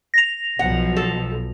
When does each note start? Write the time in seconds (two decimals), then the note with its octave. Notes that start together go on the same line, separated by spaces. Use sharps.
0.14 A#6 F7
0.59 B1 B2 F3 F#5
0.96 A4